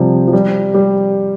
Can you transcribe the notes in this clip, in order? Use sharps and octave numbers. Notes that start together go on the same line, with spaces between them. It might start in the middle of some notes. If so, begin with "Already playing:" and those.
Already playing: C3 F3 G3
F3
G3
G3